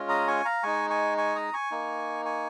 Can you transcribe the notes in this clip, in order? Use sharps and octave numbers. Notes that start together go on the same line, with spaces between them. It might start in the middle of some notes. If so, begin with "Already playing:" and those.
Already playing: G#3 C#4 F4
A#5 D#6
G#5 C#6
F5 A#5
G#3 D#4 G#5 C#6
G#5 C#6
G#5 C#6
A#5 D#6
G#5 C#6
A#3 D#4
G#5 C#6